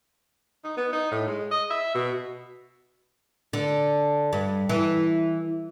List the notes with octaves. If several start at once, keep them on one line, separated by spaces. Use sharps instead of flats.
D#4
B3
D#4
A2
G#3
D#5
E5
B2
D3
G2
E3